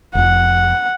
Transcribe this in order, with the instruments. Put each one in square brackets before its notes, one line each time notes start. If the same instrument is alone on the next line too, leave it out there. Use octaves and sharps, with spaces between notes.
[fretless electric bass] F1 F2 [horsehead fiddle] F#5